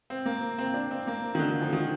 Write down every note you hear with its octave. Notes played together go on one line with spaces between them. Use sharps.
C4
A#3
C4
D4
C4
A#3
D#3
D3
D#3
F3
D#3